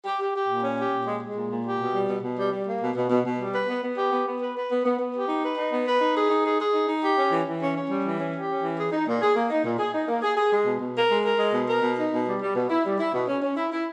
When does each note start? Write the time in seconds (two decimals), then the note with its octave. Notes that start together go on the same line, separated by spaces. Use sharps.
0.05 G4
0.20 G4
0.34 G4
0.49 A#2
0.64 C#4
0.78 G4
0.92 A#2
1.07 G#3
1.21 G#3
1.36 A#2
1.50 A#2
1.65 G4
1.80 B2
1.94 G3
2.08 B2
2.24 B2
2.37 G3
2.52 G3
2.67 A#3
2.81 B2
2.96 B2
3.10 B2
3.25 B2
3.39 G3
3.54 B4
3.69 B3
3.83 B3
3.97 G4
4.12 B3
4.27 B3
4.41 B4
4.56 B4
4.71 B3
4.85 B3
4.99 B3
5.15 G4
5.28 D#4
5.43 B4
5.58 D#4
5.72 B3
5.86 B4
6.01 D#4
6.16 G#4
6.30 D#4
6.45 G#4
6.60 G#4
6.74 D#4
6.89 D#4
7.03 G4
7.18 C#4
7.32 E3
7.47 E3
7.61 C#4
7.75 C#4
7.90 G3
8.04 E3
8.20 C#4
8.34 G4
8.49 C#4
8.62 E3
8.78 G#4
8.92 D#4
9.07 A#2
9.21 G#4
9.36 A#3
9.50 D#4
9.65 A#2
9.79 G#4
9.94 D#4
10.08 A#3
10.23 G#4
10.37 G#4
10.52 G#3
10.66 B2
10.80 B2
10.95 A#4
11.10 G#3
11.25 A#4
11.39 G#3
11.53 B2
11.68 A#4
11.82 B2
11.97 D#4
12.12 B2
12.26 G3
12.40 G3
12.55 B2
12.70 E4
12.85 G3
12.99 E4
13.13 B2
13.28 C#4
13.42 C#4
13.57 E4
13.72 E4